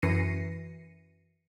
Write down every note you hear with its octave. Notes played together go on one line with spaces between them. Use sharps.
F#2 E3 A#6 C7 C#7 D#7